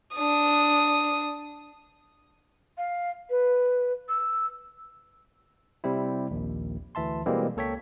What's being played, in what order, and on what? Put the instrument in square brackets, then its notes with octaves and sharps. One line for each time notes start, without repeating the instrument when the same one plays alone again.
[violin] D4 D#6
[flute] F5
B4
E6
[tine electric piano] C3 G3 C4 E4
A#1 D#2
D2 E3 E5 A5 C6
B2 E3 G3 G#3 A#3 C4
C#2 A#3 A4 C#5 G5 B6